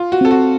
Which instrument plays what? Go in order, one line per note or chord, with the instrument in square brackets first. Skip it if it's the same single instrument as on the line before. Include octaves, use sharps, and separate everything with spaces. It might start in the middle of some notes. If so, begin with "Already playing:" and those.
Already playing: [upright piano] F4
F#4
[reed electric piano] C4 [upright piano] A4
[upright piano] F#4